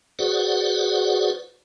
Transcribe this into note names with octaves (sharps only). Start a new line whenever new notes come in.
F#4 G#4 B4 C5 D5 F#5